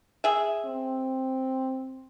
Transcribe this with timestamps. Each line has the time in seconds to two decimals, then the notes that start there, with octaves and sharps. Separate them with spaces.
0.24 G#4 E5
0.65 C4